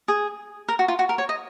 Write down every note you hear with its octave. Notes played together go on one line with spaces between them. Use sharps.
G#4
A#4
F#4
F4
F#4
A#4
C#5
D#5